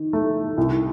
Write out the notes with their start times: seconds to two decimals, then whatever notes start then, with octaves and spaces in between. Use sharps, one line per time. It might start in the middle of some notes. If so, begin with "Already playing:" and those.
Already playing: D#3
0.13 A3
0.58 C2